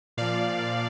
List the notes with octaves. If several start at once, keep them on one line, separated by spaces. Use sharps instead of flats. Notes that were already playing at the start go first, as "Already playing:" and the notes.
A#2 F3 D5 F5